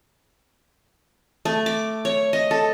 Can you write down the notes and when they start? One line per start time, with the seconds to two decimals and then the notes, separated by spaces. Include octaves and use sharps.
1.45 A3
1.66 D6
2.05 C#5
2.33 D#5
2.51 A4